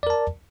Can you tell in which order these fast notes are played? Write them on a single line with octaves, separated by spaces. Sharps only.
D5 A#4 A5